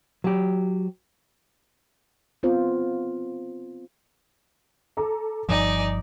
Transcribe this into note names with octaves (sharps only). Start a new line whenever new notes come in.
F#3 G4
B3 C4 F4 C5
A4 A#5 D6
G1 G2 F3 D#4 D5 G#5 D6 D#6